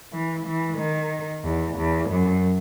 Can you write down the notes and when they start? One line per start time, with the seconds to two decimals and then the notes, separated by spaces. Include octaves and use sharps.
0.12 E3
0.46 E3
0.78 D#3
1.44 E2
1.77 E2
2.10 F#2